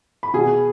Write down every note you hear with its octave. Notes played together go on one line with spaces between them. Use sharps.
B5
B2 G#4 G#5